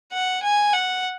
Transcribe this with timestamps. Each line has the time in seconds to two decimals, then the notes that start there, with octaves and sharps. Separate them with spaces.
0.13 F#5
0.43 G#5
0.73 F#5